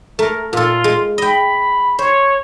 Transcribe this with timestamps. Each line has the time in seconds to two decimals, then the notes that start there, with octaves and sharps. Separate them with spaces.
0.19 A3 A#4
0.53 A#2 F4 A4
0.84 G#3
1.18 D#5 G5 B5
1.99 C5 C#5